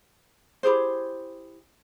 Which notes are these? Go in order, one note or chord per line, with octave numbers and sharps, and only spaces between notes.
E4 G4 G#4 C5